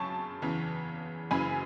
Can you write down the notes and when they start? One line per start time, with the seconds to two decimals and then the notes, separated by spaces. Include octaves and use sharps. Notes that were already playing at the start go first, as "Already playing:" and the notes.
Already playing: F#2 C#3 C#4 A5 C#6
0.42 E2 C#3 E3
1.31 F#1 F#2 C#3 E3 G#5 B5